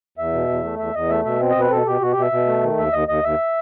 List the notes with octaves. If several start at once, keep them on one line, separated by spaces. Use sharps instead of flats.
E2 E5
B2
E2
A3
E2 E5
E2 D#5
A3 E5
B2 E5
C4
D#5
B2
B4
B2 A4
B2 G4
B2 F#4
G4
B2 E5
B2
A3
D#3
D#2 E5
D#2 D#5
D#2 D#5
D#2 E5